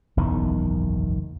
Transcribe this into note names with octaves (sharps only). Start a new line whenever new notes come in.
F#1 B1 E2 D#3